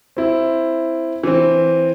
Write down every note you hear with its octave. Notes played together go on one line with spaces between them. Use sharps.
C4 E4
E3 C4